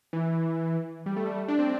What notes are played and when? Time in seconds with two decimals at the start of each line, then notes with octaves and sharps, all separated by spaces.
0.13 E3
1.06 G3
1.16 A3
1.27 G3
1.38 A3
1.48 D4
1.59 C4